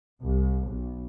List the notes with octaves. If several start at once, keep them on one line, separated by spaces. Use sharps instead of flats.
C2
B1